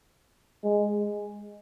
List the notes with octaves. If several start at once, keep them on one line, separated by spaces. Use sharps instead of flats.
G#3